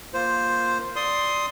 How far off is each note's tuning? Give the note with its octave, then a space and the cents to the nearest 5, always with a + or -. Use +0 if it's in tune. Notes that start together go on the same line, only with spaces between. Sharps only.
A#3 +0 F4 +5 C5 +0
D5 +0 C6 +0 D#6 +15